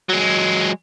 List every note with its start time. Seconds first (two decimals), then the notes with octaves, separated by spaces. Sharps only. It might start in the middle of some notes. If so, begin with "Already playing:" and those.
0.10 F#3 G#3